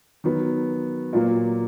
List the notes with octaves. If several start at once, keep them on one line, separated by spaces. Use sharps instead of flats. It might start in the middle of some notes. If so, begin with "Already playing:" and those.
D#3 F#3 B3
A#2 F#3 A#3